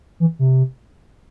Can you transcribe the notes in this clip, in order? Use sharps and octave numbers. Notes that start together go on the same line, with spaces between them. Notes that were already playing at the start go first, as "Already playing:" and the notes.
E3
C3